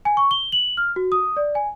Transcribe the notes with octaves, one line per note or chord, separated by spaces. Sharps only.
G#5
C#6
G7
F#7
F6
F#4
D#6
D5
G#5